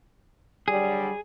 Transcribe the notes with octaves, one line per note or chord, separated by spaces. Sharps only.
D3 F#3 G3 G#4